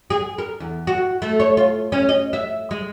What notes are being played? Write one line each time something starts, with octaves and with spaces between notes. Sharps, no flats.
G#4
A#4
E2
F#4
A3
C#5
F4
C#4
D#5
E5
G#3